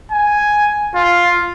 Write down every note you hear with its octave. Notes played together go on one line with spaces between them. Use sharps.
G#5
F4